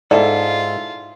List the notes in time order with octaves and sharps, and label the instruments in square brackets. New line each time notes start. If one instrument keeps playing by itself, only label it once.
[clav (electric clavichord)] G#2 [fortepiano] E4 A4 [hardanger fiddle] F4 [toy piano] D5